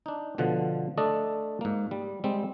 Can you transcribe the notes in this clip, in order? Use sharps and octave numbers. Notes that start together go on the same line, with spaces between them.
D4 D#4
B2 D3 F3 F#5
A3 D4 A4 D5 D#5
G#2 A#3
G3
G3 G#3 C4